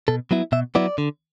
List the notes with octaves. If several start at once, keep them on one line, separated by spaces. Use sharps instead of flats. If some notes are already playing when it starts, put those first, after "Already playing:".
B2 A4
F#3 B3 E4
B2 E5
F#3 B3 E4 D5
D3